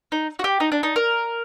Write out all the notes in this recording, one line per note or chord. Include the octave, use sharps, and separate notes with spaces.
D#4
F#4
G4
D#4
D4
D#4
A#4